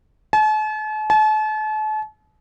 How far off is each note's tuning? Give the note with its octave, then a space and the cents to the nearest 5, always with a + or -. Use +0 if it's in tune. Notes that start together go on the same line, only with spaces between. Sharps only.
A5 -45
A5 -40